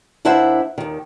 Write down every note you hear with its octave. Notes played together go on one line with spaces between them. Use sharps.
D#2 D4 E4 C5 E5 F#5
D#2 D#3